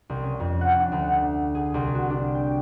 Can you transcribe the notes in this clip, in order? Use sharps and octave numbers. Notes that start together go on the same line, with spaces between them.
C2
C#4
F2
F#5
D4
D2
F#5
G#4
C2
F#4
D4
G5